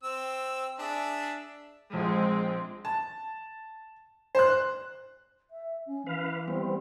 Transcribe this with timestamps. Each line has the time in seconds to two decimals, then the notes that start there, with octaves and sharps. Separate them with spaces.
0.04 C4 E6
0.79 D4 G#4 E5
1.93 A#1 G#3 C4
2.85 A5
4.35 C5 F#6
5.51 E5
5.87 C#4
6.06 E3 B4 F5
6.48 G3 B3 C4